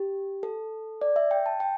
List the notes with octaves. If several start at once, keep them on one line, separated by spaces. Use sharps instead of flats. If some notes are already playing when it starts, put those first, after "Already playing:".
Already playing: G4
A4
D5
E5
G5
A5
G5